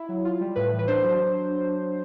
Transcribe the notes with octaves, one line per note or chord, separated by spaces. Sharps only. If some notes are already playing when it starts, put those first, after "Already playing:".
Already playing: E4
F#3
F4
G3
A2 B4
E3
B4
D4 C5
F#3